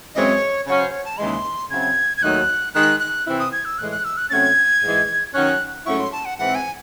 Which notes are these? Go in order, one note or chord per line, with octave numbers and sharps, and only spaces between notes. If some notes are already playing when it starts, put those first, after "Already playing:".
F#2 E3 G#3 C4 C#5 D#5
C#3 F#3 C#4 C#5
C5
C#5
A5
D#2 C#3 E3 G#3 C6
C#3 F#3 C4 E4 G#6
G#6
D#2 D#3 F#3 A3 D#4 F#6
D#3 G#3 D#4 F#6
F#6
C3 E3 C4 E4
D#6
G#6
E6
A2 E3 G#3 F#6
F#6
E6
F#6
C3 F#3 A3 C#4 G#6 A6
G#2 E3 G#3
D#3 F#3 C#4 F#6
G#2 F#3 A3 C#4 E4 C#6
C6
A5
F#5
G#2 E3 C4 F#5
G#5